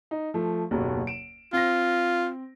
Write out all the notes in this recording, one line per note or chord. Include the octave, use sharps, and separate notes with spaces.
D#4
F3 A3
F#1 D#2 B2
D7 E7
C4 F4 A#6